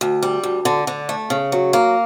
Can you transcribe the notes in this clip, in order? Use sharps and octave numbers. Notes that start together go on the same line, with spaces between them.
D2
G3
D2
D3
D3
A3
C#3
F#3
A#3